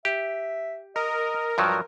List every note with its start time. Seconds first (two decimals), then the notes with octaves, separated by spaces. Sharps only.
0.05 G4 E5
0.96 A#4 D#5
1.58 G2 F3 F#3